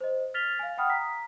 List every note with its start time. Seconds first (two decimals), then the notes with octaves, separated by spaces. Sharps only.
0.01 C5 D#5
0.34 F6 A6 B6 F7 G7
0.59 F5 G#5
0.77 F#5 G5 B5 D#6 F6
0.89 A#5 B6